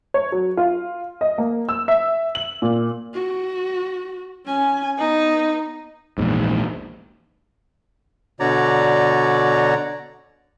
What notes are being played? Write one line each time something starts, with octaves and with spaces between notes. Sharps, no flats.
C#5
F#3
F4
D#5
A#3
E6
E5
F#7
A#2
F#4
C#4 G#5
B3 D#4
A#1 E2 G#2
B2 D3 F#4 C#5 D5 A#5